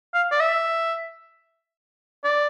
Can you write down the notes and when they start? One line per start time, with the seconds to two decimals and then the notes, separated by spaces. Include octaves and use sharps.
0.14 F5
0.32 D5
0.41 E5
2.24 D5